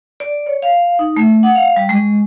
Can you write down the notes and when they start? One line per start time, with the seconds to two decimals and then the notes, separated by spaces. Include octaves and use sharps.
0.20 D5
0.46 C#5
0.62 F5
0.99 D#4
1.16 A3
1.43 F#5
1.55 F5
1.76 G3
1.89 G#3